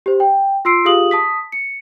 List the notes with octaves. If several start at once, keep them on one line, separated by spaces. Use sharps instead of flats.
G4 C5
G5
F4 C6 E6 C7 D7
F4 G4 G#4 F5 D#6 F#7
A5 D#6 B6
C#7